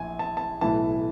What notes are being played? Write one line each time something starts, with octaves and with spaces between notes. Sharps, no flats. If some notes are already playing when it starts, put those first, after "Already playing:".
Already playing: A#1 E3 G#5
A5
A5
B1 A2 E3 A5